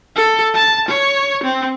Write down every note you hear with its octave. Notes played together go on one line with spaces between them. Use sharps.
A4
A5
C#5
C4